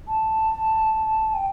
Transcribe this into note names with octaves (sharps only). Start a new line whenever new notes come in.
A5
G5